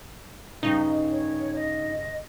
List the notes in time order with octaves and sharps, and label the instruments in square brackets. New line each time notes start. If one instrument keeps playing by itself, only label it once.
[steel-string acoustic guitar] G2 C#3 [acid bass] D#4
[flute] C#5
D#5